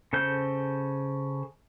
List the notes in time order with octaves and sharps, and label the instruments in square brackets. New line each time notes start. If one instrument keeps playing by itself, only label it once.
[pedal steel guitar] C#3 A4 C5 G6